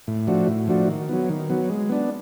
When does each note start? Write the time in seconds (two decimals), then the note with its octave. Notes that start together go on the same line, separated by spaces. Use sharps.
0.07 A2
0.27 F3 A3 D4 F#4
0.48 A2
0.68 F3 A3 D4 F#4
0.88 D#3
1.09 F#3 B3
1.29 D#3
1.50 F#3 B3
1.70 G#3
1.90 B3 D4